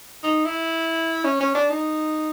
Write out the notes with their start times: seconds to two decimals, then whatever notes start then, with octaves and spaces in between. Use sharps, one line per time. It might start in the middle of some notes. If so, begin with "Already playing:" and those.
0.24 D#4
0.45 E4
1.24 C#4
1.40 C#4
1.55 D4
1.70 D#4